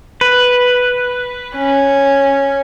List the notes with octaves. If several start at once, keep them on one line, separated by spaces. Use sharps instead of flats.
B4
C#4